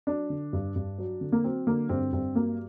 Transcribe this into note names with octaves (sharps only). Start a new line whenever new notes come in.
F#3 D4
D3
G2
G2
F#3
D3
A#3
F#3 C4
D3 A#3
G2 C4
G2 C4
F#3 A#3